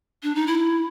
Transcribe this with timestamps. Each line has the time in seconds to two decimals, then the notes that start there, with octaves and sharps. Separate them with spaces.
0.23 D4
0.35 D#4
0.47 E4